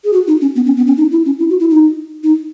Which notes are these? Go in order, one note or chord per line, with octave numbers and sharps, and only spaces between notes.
G#4
F#4
D#4
C#4
B3
C#4
B3
C#4
D#4
E4
C#4
E4
F#4
E4
D#4
D#4